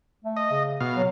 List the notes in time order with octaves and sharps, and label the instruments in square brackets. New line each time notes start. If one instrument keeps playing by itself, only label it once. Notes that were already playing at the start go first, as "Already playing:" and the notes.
[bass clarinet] A3
[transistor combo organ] D#5
[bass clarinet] C#3
[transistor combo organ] B2 F5
[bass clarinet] F#3